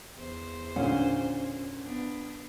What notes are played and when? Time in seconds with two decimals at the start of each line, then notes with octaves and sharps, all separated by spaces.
0.17 E2 C5
0.76 A#2 D3 C#4
1.81 B3 D4